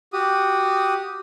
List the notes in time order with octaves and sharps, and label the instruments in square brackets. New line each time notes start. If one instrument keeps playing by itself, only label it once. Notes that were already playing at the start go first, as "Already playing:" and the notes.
[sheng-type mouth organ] F#4 G4 D#6